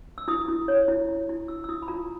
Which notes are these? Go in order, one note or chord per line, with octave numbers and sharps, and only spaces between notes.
E6
E4 D#6
E4
C#5
E4
E4
E4
E4 E6
E6
E4 D#6
B5
F4 A#5